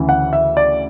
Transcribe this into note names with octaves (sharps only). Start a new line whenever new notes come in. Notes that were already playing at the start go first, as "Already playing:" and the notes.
Already playing: D2 C#3 E3
F#5
E5
D5